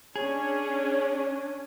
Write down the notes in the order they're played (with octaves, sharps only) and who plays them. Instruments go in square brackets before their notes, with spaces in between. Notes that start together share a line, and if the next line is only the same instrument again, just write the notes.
[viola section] C#4 D4 [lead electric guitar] G#4 [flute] C#5